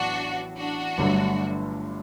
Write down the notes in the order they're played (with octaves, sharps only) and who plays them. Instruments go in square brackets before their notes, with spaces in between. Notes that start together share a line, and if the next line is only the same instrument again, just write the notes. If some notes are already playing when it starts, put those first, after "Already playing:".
Already playing: [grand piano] A1 A2 F#3 B3 [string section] D4 F#4
[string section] D4 F#4
[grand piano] G1 G2 D3 F#3 A3